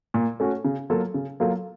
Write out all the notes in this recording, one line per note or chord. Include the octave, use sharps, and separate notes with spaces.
A#2
A3 C#4 F#4
C#3
F#3 A#3 F4 A4
C#3
F#3 A#3 F4 A4